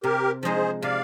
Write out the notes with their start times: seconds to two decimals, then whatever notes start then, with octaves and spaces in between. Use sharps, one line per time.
0.04 C3 G4 A#4
0.43 F3 G#3 D#4 G#4 C5
0.82 C3 D5 F5